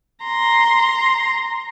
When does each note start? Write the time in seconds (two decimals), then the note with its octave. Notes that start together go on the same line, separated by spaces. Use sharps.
0.24 A#5 C6